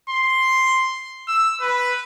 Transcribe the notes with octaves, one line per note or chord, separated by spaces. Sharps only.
C6
E6
B4